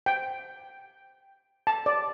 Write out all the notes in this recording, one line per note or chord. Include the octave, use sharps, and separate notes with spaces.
G5
A5
D5